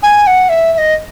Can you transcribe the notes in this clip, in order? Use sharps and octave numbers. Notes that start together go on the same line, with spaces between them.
G#5
F#5
E5
E5
D#5